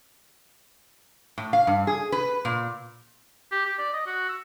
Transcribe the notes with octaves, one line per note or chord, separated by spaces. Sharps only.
A2
F5
G2
G#4
B4
A#2
G4
G4
D5
D#5
F#4
E6